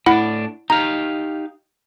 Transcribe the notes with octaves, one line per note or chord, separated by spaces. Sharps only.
A2 D4 E4 F#5 B5
D#4 G4 F5 A#5